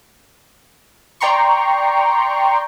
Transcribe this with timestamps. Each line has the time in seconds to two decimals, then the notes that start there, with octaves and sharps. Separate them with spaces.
1.21 D5 G5 A#5 C6 C#6